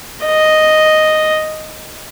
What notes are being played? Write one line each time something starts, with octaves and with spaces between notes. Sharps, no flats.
D#5